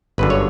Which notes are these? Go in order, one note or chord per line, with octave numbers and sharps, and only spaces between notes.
G1 F#2 D3 B4
C#5